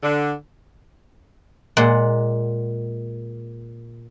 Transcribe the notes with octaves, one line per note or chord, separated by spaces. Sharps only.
D3
A#2 G#3 F#5